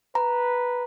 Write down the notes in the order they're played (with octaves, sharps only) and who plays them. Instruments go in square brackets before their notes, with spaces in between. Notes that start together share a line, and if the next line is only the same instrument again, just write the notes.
[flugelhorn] B4 [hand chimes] A#5